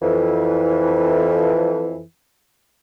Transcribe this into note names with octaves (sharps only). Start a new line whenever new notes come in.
F2 E3